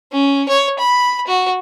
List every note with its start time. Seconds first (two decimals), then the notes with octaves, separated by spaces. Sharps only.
0.12 C#4
0.49 C#5
0.79 B5
1.27 F#4